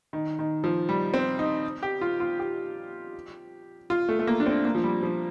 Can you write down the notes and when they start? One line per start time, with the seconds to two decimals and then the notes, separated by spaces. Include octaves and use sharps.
0.13 D#3
0.39 D#3
0.64 F3
0.89 G3
1.14 C4
1.39 D#4
1.83 G4
2.01 F4
2.20 F4
2.39 G4
3.90 F4
4.09 A3
4.19 A3
4.27 A#3
4.40 D4
4.46 C4
4.65 A#3
4.75 F3
4.84 G3
5.03 F3